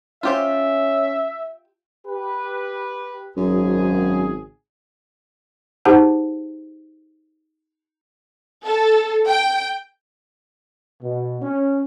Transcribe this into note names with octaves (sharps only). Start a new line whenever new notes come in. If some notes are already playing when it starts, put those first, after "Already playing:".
C#4 F4 G4 C5 E5
G4 B4
G#1 F#2 C#3 G#4
D#4 G4 G#4 C5 F#5 A5
A4
G5
B2
C#4